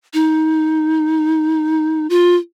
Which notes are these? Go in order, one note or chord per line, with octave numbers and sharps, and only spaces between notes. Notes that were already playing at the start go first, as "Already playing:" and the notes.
D#4
F4